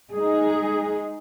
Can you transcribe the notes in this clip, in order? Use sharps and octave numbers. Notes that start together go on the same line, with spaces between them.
G#3 D#4 G#4